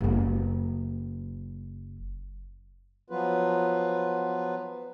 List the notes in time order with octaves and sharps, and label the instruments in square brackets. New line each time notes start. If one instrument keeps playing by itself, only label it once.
[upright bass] F#1 F#3
[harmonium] F3 F#3 B3 F4 B4